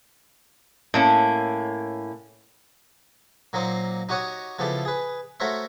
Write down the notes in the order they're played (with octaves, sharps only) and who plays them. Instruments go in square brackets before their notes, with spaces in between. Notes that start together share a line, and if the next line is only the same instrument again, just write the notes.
[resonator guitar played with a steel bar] A2 A#3 C#4
[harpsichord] A#2 F#3 A#3 C4 D#4 C5
D#4 F#4 G4 C#5 F#5 D#6
C#3 F3 B3 E4 G4 A4
G#4 B4
A3 F#4 A#4 C5 C#5 E5